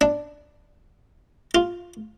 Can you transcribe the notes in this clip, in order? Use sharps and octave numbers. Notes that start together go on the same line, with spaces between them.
D4
F4